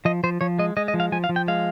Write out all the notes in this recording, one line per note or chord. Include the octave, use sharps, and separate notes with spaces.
F3 D#5
F3 C5
F3 C#5
G#3 D#5
G#3 D#5
D#5
F3
F5
F3 G#5
F5
F3
G5
G#3 F5